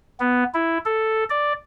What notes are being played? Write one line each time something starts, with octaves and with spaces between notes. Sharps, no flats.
B3
E4
A4
D5